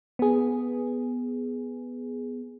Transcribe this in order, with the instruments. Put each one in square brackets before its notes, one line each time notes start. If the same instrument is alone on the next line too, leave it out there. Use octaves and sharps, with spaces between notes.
[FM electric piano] B3 G#4